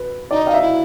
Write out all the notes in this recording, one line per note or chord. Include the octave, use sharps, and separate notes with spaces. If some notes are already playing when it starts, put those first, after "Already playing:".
Already playing: B4
D#4 D5
F5
E5
E4